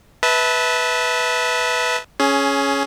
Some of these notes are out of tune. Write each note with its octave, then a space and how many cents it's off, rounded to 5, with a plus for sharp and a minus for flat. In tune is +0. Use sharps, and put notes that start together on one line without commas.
B4 +0 E5 -30 A5 +0
C#4 +0 G#4 +20